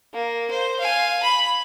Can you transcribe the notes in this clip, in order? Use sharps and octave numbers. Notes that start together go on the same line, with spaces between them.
A#3
C5
F5 G#5
B5